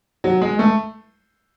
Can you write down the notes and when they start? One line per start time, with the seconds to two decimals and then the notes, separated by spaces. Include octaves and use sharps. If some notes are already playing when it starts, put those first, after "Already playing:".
0.24 F#3
0.41 G#3
0.59 A3